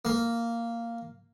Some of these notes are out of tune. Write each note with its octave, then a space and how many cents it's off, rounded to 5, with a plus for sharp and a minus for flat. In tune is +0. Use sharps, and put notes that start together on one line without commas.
A#3 -5